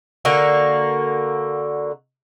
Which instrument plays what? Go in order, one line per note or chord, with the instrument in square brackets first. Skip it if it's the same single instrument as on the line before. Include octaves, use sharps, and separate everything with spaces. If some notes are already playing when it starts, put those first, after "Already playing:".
[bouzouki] D3 A#3 F#4